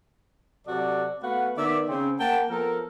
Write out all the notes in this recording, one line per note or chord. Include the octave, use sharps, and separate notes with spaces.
C3 F#3 F#4 A4 D5
A3 B3 F#4 B4 F5 F#5
D#3 B3 D5 E5
C#3 C4
A#3 F#5 G5 A5
F3 B3 A4 A#4